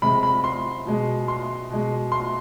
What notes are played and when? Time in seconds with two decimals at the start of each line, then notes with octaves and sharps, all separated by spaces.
0.02 C3 G#3 B5
0.23 B5
0.44 C6
0.86 B2 G#3
1.28 C6
1.70 B2 G#3
2.12 C6